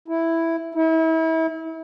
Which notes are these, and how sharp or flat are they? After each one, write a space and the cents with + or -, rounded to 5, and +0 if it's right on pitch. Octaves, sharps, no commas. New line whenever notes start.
E4 +0
E4 -35